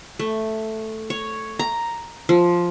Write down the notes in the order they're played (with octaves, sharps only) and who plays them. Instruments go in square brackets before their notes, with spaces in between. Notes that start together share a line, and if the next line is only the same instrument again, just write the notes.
[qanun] A3
C#5
A#5
F3